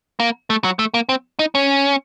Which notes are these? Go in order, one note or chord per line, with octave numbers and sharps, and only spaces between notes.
A#3
A3
F#3
A3
A#3
C4
D#4
C#4